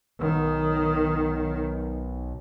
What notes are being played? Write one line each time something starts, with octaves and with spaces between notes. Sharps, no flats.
B1 D#3